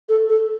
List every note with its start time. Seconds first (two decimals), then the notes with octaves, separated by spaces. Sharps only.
0.09 A4
0.29 A4